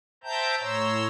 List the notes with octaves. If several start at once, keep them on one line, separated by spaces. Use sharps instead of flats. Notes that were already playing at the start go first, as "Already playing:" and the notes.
C5 E5 G5 A5 A#5 G6
A2 C#5 A#5 C6 E6